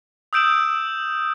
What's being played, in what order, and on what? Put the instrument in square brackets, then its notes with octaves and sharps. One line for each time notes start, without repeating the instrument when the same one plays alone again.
[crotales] D#6 E6 G6 D7 E7 F#7